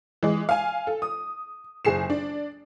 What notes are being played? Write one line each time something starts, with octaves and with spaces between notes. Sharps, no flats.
E3 G#3
F5 G#5
A4
D#6
F#1 G#4 C7 E7
D4